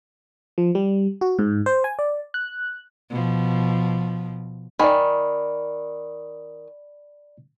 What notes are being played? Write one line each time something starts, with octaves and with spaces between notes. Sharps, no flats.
F3
G3
F#4
G#2
C5
G#5
D5
F#6
B2 F3
D#3 D5 G#5 B5